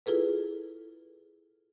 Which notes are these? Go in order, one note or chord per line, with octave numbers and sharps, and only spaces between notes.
E4 F4 G#4 A4 B4